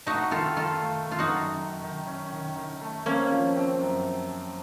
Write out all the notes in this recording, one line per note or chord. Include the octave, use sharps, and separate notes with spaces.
A3 D#4 F#4
D#3 F4 A4
D#3 F4 A4
A3
A3
F4
D#4 F#4
F#2
F#2
D#3
C#4
D#3
D#3
A3
A#3 C4 C#4
F3
C4
F#2